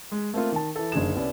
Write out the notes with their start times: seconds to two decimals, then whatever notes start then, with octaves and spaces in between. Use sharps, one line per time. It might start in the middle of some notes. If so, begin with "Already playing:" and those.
0.12 G#3
0.34 A3 A#3 C4 F4
0.52 D#3 A5
0.76 E3 A4
0.92 F#1 D3 D#4 G#4 E7
1.15 C2 B3 C#4 D5